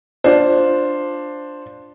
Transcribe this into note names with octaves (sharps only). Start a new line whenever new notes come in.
D4 F4 C5